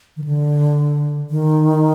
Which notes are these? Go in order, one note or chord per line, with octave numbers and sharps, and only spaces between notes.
D#3
D3
D#3